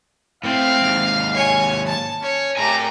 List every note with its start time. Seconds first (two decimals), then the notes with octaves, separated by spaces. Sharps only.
0.44 A2 A3 C4 F5
0.82 D#2 G#2
1.34 C#5 G#5
1.86 A5
2.22 C#4 C#5
2.57 A3 G4 A#4 G#5 A#5